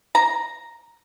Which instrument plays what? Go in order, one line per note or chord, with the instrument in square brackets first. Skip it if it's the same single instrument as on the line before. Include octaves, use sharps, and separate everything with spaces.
[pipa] A#5